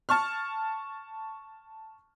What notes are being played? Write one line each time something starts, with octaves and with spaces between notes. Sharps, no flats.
A5 C#6 F6